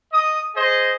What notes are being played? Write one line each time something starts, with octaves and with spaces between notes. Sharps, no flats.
D#5 D#6
G#4 C5 D#5